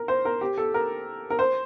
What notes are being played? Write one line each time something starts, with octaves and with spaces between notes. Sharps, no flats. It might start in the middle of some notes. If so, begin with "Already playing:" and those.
Already playing: A#4
C5
A#4
G4
A4
A#4
A#4
C5